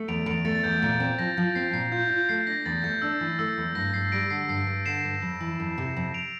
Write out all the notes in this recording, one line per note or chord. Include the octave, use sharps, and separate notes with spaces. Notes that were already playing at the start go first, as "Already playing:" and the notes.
Already playing: A3
E2 D7 F7
E2 D7 F7
A3 A6
A6
E2 G6
A#2 A6
C4
F3 A#6
F3
C4 C7
A#2 C7
F4 G6
F4 G6
A3 C7
D4 A#6
E2 A6
A3 G6
D4 E6
E3
A3 E6
E2
G2 A#6
G2 C7
G3 A#6 D7
D3 C7
G2 C7
G2
D3 C7 E7
G2
F2
E3
F2
C3
F2
D7 F7